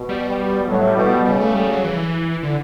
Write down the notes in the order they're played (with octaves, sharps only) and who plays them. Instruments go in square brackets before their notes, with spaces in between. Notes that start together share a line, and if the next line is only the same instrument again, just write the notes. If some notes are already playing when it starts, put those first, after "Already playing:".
Already playing: [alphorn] B2
[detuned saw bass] G3
[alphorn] A2 [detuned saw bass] F#3
[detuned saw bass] G3
[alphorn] B2
[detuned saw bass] G3
[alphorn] C#3 [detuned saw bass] G3
[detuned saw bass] A3
G3
F#3
E3
D3